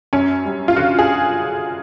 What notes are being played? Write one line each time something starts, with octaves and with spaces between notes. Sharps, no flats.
F#2 C#4
G3
F4
D3 F#4
G#4